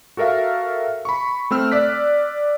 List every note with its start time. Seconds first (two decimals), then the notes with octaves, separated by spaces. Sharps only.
0.17 F#4 A4 A#4 E5 F5
1.05 B5 C#6
1.51 A3 C4 E6 F6
1.72 D5 D6 F#6 B6